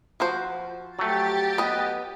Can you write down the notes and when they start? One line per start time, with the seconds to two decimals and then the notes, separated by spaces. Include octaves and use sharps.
0.20 F3 F#4 C5
0.99 F#3 A3 G4 A6
1.58 B3 D#5